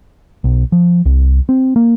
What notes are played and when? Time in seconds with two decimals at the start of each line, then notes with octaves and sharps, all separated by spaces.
0.44 B1
0.72 F3
1.06 C2
1.49 C4
1.76 A#3